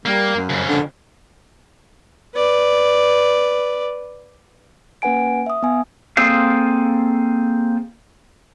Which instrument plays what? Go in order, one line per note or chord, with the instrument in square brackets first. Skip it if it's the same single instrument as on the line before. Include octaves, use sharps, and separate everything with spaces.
[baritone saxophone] G3 [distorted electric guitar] A#3
[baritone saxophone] F#2
[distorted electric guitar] F2 C#3
[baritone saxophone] D3
[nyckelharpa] B4 D5
[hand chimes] A#3 C#4 B4 F#5 G#5 D7
E5 D#6
B3 G#5
[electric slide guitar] A#3 C4 G#4 A4 C5 F5